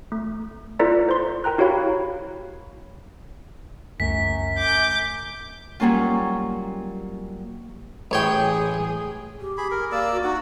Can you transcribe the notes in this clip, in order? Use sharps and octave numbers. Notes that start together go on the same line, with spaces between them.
A3
E4 F4 A4 B4 D5 A#5
C5 C6
A#4 G5 A#5 F#6
E4 F#4 G4 C#5 F5 B5
F#1 C#2 F#2 A3 B6
D6 G6
F#3 G3 A#3 C#4 F4
A1 G#4 C#5 G5
G4
G#4 B5
A#4
A#3 D5 F5 E6
F#4
D#4 F#4 F#5